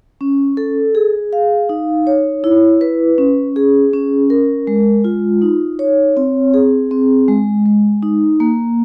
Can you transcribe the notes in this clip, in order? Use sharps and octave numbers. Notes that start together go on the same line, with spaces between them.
C#4
A4
G#4
F5
D#4
C#5
E4
B4
C#4
G#4
C#4
A#4
G#3
F4
D#4
C#5
C4
G#4
C4
G#3
G#3
D#4
A#3